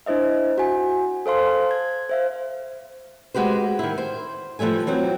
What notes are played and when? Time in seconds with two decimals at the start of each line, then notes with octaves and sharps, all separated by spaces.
0.06 D4 E4 C5 D#5 E5
0.58 F#4 G#5
1.26 A4 C5 F5 C6
1.71 G#6
2.09 C5 E5 F5
3.34 G#3 F#4 G4 B4 C5
3.79 D#3 E4
3.98 C5
4.59 E3 F3 G3 A3 G#5
4.87 E3 F#3 C4